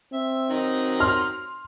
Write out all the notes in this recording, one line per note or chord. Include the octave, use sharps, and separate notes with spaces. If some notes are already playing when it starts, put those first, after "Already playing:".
C4 E5
D#3 F#3 D#4
C6 F6